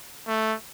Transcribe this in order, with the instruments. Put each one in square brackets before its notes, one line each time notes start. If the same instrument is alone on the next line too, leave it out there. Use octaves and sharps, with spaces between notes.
[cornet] A3